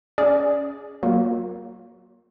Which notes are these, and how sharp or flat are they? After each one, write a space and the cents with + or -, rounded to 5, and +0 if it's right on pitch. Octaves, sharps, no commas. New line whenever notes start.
C#4 +20 G#4 +0 D5 +0
F#3 +20 A#3 +10 F4 +40